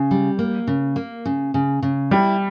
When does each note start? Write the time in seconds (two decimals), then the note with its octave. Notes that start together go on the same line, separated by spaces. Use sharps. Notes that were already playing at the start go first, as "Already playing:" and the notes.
Already playing: C#3
0.11 G3
0.39 A#3
0.67 C#3
0.96 A#3
1.25 C#3
1.54 C#3
1.82 C#3
2.11 G3 E4